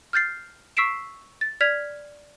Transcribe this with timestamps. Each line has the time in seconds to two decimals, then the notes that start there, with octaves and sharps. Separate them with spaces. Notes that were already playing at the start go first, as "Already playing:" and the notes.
0.13 F6 G6 A6 C7
0.77 C#6 E6 B6 C7 D7 E7
1.41 A6
1.61 D5 F6 G#6 B6 F7